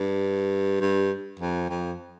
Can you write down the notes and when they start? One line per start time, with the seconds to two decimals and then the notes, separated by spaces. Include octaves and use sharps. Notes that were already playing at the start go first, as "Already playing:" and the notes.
Already playing: G2
0.81 G2
1.39 F2
1.69 F2